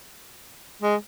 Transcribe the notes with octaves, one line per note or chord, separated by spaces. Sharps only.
G#3